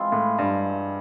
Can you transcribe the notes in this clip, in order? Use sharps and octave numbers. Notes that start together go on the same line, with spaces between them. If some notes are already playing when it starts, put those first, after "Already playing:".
Already playing: E3 G#3 C4 F4
A2
G2